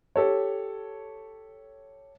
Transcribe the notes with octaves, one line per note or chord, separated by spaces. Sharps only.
G4 A4 C#5